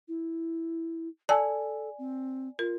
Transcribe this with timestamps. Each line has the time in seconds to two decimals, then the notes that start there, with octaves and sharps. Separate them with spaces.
0.08 E4
1.29 A4 D5 G#5 A5 E6
1.99 C4
2.59 F4 A#4